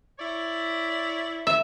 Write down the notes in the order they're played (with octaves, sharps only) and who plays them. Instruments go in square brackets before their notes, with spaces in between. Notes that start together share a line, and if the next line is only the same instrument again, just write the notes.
[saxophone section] E4 C#5 D5
[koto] E5